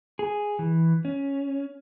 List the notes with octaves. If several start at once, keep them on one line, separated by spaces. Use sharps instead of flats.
G#4
E3
C#4